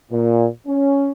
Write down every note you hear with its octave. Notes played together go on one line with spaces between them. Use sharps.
A#2
C#4